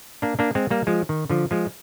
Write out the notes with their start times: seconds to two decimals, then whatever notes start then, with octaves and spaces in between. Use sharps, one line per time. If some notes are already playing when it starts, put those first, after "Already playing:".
0.22 A#3 D4
0.39 A#3 D4
0.55 G#3 C4
0.70 G3 A#3
0.87 F3 G#3
1.09 D#3
1.30 D3 F3
1.51 F3 G#3